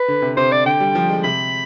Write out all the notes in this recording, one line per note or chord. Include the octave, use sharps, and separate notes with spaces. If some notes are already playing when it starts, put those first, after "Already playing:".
Already playing: B4
D3
C3
C3 C5
D5
D3 G5
G3
F3
G#3
C3 B5